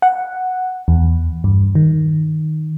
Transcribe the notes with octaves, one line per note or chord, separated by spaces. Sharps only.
F#5
E2
G2
D#3